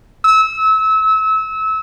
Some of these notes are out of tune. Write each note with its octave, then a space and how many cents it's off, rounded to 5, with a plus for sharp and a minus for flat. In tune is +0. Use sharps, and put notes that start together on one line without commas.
E6 -30